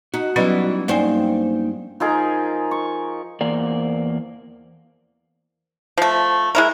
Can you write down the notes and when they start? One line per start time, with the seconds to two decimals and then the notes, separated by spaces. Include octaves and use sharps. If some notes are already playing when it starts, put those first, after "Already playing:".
0.14 D#4 F#4
0.36 E3 F#3 G3 B3 C#4 D#4
0.88 G2 A#3 D#4 F#4 C5 D5 G5 G#5
2.00 F3 D#4 G#4 A#4
2.71 C#6
3.41 E2 A#3 C5 D5 A#5
5.98 F3 A3
6.55 G#3 E4 A#4